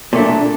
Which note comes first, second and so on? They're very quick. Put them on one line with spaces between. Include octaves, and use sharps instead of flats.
A#2 A3 D4